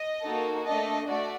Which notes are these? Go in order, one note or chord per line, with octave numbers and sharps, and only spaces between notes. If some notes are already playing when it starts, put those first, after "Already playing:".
Already playing: D#5
A#3 D#4 F#4 A4
A3 D4 A4 D#5
A3 F#4 D5